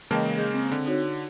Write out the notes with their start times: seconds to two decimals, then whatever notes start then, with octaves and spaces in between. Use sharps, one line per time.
0.11 C#3 E3 G#3 A#3 D#5 G5 A5
0.37 G#4 D#5 G6
0.54 C4
0.72 D3
0.86 D#4 F#4 C#5